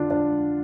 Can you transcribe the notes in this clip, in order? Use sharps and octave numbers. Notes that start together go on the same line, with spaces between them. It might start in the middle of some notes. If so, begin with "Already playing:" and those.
Already playing: D3 D4 F4
D4